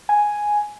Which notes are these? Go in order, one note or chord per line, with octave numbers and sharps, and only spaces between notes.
G#5